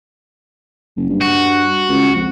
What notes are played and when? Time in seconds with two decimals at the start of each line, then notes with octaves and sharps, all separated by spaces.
0.97 F#1
1.09 G2
1.21 F#4
1.89 C#2
2.15 F2